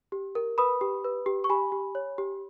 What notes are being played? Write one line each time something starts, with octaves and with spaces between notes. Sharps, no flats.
G4
A#4
B4 B5 D#6
G4
B4
G4
C#6
G4 G#5 B5
G4
C#5
G4